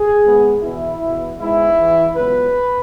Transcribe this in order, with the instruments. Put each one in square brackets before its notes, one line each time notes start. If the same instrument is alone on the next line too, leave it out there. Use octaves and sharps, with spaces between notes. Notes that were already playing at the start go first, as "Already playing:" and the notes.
Already playing: [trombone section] G#4
G#1 G#2 G#3 B3
E2 B2 B3 E4
E2 B2 B3
G#2 G#3 B3 E4
E2 E3 B3
C#2 C#3 F#3 B3 B4